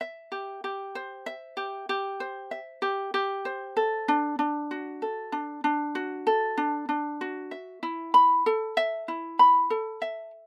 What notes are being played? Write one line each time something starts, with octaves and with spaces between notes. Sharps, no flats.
E5
G4
G4
C5
E5
G4
G4
C5
E5
G4
G4
C5
A4
D4
D4
F#4
A4
D4
D4
F#4
A4
D4
D4
F#4
E5
E4
B5
A4
E5
E4
B5
A4
E5